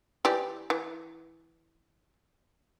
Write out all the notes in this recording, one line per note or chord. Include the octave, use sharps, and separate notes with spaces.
E3 G4 D5
E3